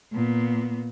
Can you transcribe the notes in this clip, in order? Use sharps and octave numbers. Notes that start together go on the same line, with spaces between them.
A#2 B3